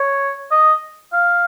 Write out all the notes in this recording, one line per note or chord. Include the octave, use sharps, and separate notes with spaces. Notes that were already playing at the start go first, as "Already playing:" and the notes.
Already playing: C#5
D#5
F5